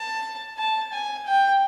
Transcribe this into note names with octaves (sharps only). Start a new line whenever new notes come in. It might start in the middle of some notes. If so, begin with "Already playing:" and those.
Already playing: A5
A5
G#5
G5